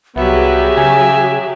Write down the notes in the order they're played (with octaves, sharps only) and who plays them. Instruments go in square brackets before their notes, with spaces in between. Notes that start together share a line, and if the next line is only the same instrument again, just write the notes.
[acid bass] C2 [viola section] F#3 G4 G#4 [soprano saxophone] B3 [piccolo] E5
[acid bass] C#3 [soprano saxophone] G#5